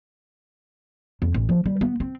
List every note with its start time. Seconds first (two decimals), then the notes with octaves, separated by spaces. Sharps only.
1.22 F2
1.34 A1
1.49 F3
1.66 G3
1.81 B3
2.00 C4